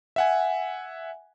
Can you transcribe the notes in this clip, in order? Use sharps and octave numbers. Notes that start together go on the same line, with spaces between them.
E5 F#5 G#5